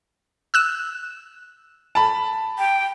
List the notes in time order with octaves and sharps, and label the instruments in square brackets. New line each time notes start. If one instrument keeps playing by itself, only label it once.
[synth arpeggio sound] E6 F#6 E7
[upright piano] A5 B5
[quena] G5